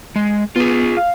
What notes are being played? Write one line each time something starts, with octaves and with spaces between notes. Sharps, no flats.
G#3
B3 F4 G#4
F5